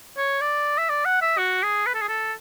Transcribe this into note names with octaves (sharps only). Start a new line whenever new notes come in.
C#5
D5
E5
D5
F#5
E5
F#4
G#4
B4
A4
G#4
A4